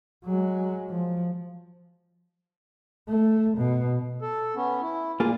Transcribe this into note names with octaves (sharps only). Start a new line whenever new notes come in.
F#3 G#3
F3
A3
B2
A4
B3 C#4
E4
A#2 A#3 F4 G#4